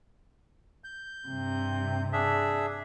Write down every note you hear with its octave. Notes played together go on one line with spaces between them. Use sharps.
G6
G2 C3
D4 G#4 E5